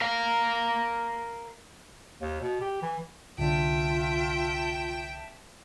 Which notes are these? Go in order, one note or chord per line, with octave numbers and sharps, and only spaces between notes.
A#4 F5
D#2
B2
G4
E3
C2 D3 F4 E5 G5 A5